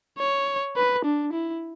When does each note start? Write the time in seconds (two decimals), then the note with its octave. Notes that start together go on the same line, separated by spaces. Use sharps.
0.18 C#5
0.76 B4
1.05 D4
1.33 E4